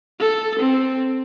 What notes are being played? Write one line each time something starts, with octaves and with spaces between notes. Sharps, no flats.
A4
C4